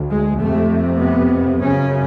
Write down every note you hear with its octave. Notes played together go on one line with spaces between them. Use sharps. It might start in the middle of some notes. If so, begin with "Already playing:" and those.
Already playing: D2
G#3
F2 C3 A3
B3
F#2 C#3 C#4